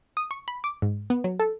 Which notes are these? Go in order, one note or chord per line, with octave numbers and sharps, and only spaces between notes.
D#6
C#6
B5
D6
G#2
B3
F#3
A4